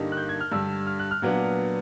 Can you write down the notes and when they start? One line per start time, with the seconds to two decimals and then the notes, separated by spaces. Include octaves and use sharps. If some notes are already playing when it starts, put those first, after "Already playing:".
Already playing: G2 D3 G3 A#3 D#4
0.12 F#6
0.17 G6
0.29 G#6
0.40 F6
0.52 G2 D3 G3 E6
0.87 F6
0.99 F#6
1.11 F6
1.22 A#2 F#3 B3 D4